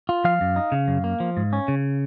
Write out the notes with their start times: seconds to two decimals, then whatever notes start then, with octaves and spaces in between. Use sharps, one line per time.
0.09 F4
0.24 F3 F5
0.41 F#2
0.56 D#4
0.72 C#3
0.88 F#2
1.04 A#3
1.20 F3
1.37 G#2
1.53 C#4
1.68 C#3